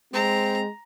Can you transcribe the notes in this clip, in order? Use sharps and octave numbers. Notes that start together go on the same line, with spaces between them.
G#3 C4 A#5